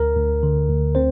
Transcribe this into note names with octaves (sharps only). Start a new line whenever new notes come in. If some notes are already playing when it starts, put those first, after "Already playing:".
Already playing: D2 A#4
D2
D3
D2
C4 C5